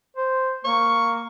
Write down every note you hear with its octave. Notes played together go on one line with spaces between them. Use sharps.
C5
A#3 C#6